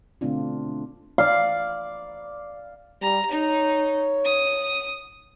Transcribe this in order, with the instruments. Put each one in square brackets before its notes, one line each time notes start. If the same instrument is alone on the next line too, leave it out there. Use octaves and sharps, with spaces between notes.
[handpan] B2 D3 A3 C4 D4 F4
[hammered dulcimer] D5 F5
[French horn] G3 [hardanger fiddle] A#5
[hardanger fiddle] D#4 [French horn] C#5
[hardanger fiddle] D#6